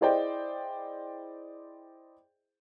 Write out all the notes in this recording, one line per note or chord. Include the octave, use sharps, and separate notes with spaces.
E4 G#4 C5 D5 D#5 G5